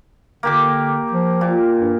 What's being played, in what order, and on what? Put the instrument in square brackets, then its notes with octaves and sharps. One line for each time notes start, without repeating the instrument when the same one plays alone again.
[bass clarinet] D3 [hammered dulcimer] A#3 G4 D6
[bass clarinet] F3
[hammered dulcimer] A#2
[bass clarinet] G2